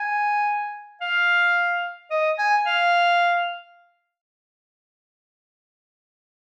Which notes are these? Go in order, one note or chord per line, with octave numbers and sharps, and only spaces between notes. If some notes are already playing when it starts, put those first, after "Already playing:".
Already playing: G#5
F5
D#5
G#5
F5